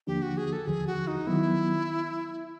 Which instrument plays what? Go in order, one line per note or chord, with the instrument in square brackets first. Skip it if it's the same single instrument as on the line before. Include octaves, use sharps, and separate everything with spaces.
[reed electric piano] D#2 D3 F3 A#3 D4 [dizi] G4
[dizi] F#4
G#4
A4
[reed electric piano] D#2 D3 F3 [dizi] G#4
[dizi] F#4
D#4
[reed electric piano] D#3 F#3 B3 [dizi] E4